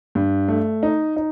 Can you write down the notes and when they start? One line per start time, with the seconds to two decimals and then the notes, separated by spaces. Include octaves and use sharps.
0.15 G2
0.48 A3
0.83 D#4
1.17 D#4